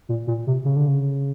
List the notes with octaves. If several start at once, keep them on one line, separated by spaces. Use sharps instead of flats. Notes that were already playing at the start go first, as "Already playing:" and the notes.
A#2
A#2
C3
C#3
D3
C#3